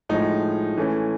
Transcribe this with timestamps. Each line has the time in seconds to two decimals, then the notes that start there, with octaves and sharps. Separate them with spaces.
0.09 A2 F3 G#3 D#4
0.77 E3 A3 C#4